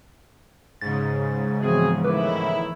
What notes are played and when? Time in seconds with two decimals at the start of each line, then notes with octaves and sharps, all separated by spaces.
0.81 G#2 C#3 A6
1.61 E3 F3 B3 C4 F#4 G#4
2.04 A2 D#3 E4 A#4 B4 D6